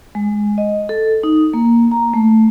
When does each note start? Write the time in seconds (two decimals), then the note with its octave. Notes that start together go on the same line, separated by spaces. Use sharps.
0.15 G#3
0.58 D#5
0.89 A4
1.23 D#4
1.53 A#3
1.91 A#5
2.14 A3